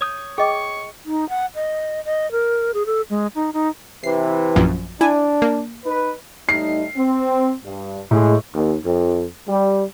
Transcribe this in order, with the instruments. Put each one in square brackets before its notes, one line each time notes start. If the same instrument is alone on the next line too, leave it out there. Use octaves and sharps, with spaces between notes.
[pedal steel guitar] C#5 D#6 G6
[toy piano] G#4 D#5 [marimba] G5 D6 [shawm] C#6
[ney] D#4
F#5
D#5
D#5
A#4
G#4
A4
G#3
D#4
D#4
[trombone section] C3 E3 [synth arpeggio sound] C7
[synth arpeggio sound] A#1 F#2 F3
[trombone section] D4 [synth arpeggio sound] E4 G#5
[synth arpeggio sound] A#3
[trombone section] D#4 B4
[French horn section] A2 G3 D#4 [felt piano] C7
[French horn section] C4
G2
[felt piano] A2 [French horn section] G#3
[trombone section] D#2
F2
G3